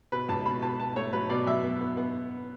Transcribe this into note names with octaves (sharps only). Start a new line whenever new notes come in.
B2 B4
C#2 A5
B2 B5
B2 A5
B2 A5
A3 C#5
F#3 B4
B2 D5
F#2 E5
B3
B3
B3